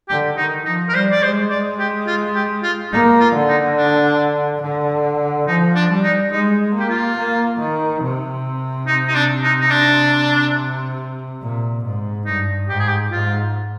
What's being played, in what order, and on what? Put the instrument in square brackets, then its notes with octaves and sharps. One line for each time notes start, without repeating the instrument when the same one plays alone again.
[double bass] D3 [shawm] G4
[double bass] D#3 [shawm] D#4
[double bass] F3 [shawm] D#4
[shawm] A#4
[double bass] G3 [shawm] C5
[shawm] D5
[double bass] G#3 [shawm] C5
[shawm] D5
G4
F4
G4
F4
[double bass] A#3 [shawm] D#4
[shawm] F4
[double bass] D3
[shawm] D#4
D4
[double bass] D3
[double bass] F3 [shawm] D#4
[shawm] D4
[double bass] G3
[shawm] D#4
[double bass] G#3 [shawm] D#4
[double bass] A#3 [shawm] G4
[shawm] F4
[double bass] A#3
D#3
C3
[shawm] D#4
D#4
D4
D#4
D#4
D4
[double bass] A#2
G#2
[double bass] G2 [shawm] D#4
[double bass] G#2 [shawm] G4
[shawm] G#4
G4
[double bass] G#2 [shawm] F4